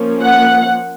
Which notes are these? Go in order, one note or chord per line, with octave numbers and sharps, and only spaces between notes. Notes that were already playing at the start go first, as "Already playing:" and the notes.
Already playing: F3 A#3 C#4
F#5